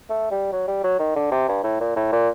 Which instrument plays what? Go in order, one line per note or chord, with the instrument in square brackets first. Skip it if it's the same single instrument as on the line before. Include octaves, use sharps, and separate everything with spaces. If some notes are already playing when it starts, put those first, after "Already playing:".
[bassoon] A3
G3
F#3
G3
F#3
D#3
D3
C3
G2
A2
A#2
A2
A#2